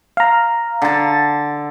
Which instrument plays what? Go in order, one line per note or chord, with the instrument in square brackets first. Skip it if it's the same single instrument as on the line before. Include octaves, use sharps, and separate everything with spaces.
[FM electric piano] F5 A#5
[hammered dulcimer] D3 A5